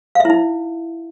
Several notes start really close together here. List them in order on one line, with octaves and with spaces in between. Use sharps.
F5 E5 E4 D#4